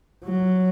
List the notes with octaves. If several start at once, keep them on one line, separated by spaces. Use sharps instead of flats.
F#3